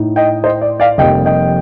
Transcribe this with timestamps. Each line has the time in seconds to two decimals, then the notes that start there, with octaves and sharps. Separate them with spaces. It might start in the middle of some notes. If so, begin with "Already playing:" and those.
Already playing: A2 A3 D#4
0.16 D#5 G5
0.44 C5 D#5
0.61 D5
0.80 D5 F5
0.98 F1 F2 C3 G3 A#3 D#5 G5
1.25 D#5 G5